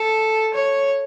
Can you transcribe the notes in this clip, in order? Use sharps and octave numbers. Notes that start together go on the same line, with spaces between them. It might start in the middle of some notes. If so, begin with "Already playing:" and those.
Already playing: A4
C#5